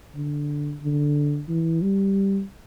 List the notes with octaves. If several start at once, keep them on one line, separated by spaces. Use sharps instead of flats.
D3
D3
E3
G3